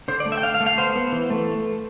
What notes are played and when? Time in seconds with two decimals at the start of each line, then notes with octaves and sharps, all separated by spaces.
0.08 D3 C5
0.20 D5
0.26 A3
0.32 E5
0.37 G5
0.43 D3 F5
0.55 F5
0.60 A3
0.66 F5
0.78 B3 C5
0.96 B3
1.12 E3
1.30 A3